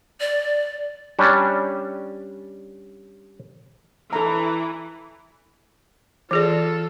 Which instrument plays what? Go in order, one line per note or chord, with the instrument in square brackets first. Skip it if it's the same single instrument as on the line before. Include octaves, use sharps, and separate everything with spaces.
[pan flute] D5
[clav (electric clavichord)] G3 C#4 D4
[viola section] E3 [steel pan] A4 A#5
[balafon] E3 G#4 D5 [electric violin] F4 A4